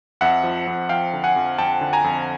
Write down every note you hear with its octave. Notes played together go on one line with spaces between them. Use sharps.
F2 E5 F#5
F3
F2
F3 F5 G5
D3
F#5 G#5
F2
F2 G5 A5
D3
G#5 A#5
F2